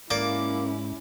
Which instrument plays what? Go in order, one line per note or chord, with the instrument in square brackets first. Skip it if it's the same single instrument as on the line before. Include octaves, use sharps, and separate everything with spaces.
[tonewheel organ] G#2 [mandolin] A#3 [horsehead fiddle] C#4 E4 [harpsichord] D5 D6